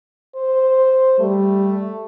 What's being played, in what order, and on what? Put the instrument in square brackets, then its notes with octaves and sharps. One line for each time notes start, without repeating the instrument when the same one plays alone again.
[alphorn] C5
[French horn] G3 [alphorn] A3